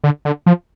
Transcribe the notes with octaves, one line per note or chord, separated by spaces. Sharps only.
D3
D3
F3